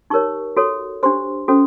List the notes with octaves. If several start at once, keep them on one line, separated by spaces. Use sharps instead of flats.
D#4 G4 A#4 C#5 C#6
F#4 A4 C#5
D4 G4 C5 C6
C#4 F#4 A4 C5